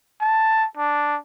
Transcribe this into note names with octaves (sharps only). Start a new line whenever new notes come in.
A5
D4